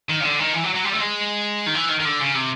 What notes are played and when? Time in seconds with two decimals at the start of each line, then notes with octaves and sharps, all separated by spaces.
0.09 D#3
0.20 C#3
0.23 D3
0.39 D#3
0.53 E3
0.63 F#3
0.74 F#3
0.84 G3
0.92 A3
0.99 G#3
1.66 D#3
1.75 E3
1.89 D#3
2.00 D#3
2.05 D3
2.20 C#3
2.35 C3